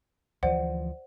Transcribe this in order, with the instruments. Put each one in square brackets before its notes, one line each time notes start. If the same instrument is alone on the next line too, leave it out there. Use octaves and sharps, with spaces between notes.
[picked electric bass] D2 E3 F3 [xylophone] C5 D5 F#5